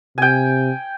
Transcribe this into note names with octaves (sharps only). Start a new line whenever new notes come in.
C3 G5 G#5